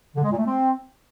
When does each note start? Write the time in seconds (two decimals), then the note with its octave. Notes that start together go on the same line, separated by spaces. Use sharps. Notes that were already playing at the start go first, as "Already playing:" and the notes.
0.15 D3
0.23 G#3
0.31 A#2
0.38 A3
0.46 C4